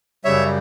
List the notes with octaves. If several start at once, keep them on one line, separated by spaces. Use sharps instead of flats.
F#2 C#3 G3 C#5 E5